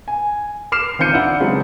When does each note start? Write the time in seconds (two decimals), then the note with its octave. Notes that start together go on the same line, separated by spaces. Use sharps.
0.08 G#5
0.72 D6 F6 C7 E7
0.99 D#3 C4 F4 G6 C#7 D#7
1.13 D4 E4 F5 F#5
1.40 C#3 F#3 G#3 C4 F4